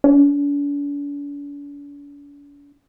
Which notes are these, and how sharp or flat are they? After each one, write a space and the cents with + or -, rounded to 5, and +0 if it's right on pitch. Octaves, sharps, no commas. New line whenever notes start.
D4 -45